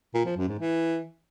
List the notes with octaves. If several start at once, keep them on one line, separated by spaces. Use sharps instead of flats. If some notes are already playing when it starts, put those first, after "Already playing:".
A#2
F3
F#2
G#2
E3